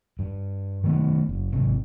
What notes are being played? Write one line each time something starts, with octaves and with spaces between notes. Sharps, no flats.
G2
D#3 A3 B3
F#1
G#1 C3